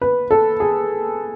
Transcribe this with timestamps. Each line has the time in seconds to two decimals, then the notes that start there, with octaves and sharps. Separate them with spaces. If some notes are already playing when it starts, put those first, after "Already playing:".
0.02 B4
0.31 A4
0.60 G#4